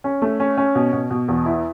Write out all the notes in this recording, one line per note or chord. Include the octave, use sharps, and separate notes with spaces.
C#4
A3
C#4
C#4
B2
B2
B2
E2
E4